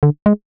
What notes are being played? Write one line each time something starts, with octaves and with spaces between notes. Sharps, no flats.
D3
G#3